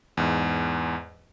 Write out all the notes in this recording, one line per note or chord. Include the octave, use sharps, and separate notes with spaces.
E2 G#2